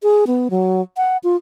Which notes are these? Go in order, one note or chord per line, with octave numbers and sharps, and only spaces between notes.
G#4
B3
F#3
F#5
F4